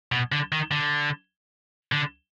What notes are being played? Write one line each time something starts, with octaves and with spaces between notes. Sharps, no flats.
B2
D3
D#3
D3
D3